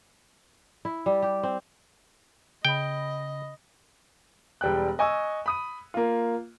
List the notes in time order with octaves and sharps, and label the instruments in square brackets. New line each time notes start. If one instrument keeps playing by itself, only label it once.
[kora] E4
G3
G4
C4
[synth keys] C#3 B5 [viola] D#5 [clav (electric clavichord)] G5
[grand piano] E1 G3 G5 F#6
D#5 G#5 C#6 E6
B5 D#6 D#7
A#3 F4